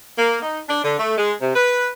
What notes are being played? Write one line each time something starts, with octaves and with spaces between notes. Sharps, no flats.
A#3
D#4
D4
D3
A3
G#3
C3
B4